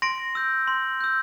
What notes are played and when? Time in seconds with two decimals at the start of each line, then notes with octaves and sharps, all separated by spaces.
0.02 C6 A#6 D7
0.35 E6 G6
0.68 C6
1.01 E6 G6